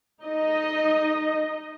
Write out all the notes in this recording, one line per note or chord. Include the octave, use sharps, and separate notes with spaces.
D#4 D#5